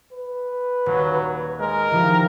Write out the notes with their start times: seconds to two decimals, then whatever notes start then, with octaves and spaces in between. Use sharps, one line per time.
0.12 B4
0.86 D#1 F#3
1.60 G#3 A#4
1.91 D#3 F3 E4 G4